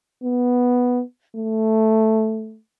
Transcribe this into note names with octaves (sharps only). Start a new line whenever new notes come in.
B3
A3